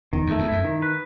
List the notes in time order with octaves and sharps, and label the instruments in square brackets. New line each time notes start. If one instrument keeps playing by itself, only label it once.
[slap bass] E2 [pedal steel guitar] D#3
[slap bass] E2
[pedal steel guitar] A3
[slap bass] E2
[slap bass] F#2 [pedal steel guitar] E4
[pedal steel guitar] D#3
B4